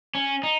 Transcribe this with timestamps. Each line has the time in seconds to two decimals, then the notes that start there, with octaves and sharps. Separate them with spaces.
0.15 C#4
0.43 D#4